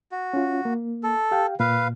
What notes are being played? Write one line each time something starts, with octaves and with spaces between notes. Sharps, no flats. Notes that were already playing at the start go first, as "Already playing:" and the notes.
F#4
C#4 F4
A#3
A4
G4 F5 G5
A#2 B4 F5